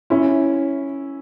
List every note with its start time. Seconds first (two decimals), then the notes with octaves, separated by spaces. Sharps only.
0.10 C#4 E4